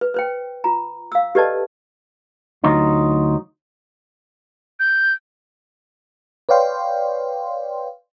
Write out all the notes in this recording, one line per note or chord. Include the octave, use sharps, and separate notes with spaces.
B4
B4 C5 G5
F4 A#5
F5 E6
G4 A4 B4 D5 D#5 A5
D2 F#3 D#4 F4
G6
B4 C#5 D5 F5 G5 C6